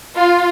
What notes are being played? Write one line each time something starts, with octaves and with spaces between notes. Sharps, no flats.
F4